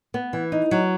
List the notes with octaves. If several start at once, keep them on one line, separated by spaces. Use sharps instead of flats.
B3
E3
D#4
F#3